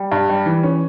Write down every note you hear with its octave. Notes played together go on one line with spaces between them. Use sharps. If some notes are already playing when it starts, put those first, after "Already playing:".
Already playing: G3
G2
G3
E3
C#4